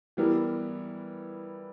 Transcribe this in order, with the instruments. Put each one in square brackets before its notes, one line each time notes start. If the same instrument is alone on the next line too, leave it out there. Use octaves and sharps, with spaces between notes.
[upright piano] E3 G3 B3 E4 A#4